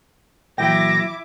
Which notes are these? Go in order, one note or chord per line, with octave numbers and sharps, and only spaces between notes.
A#2 E3 F#3 E4 G5 D6 A#6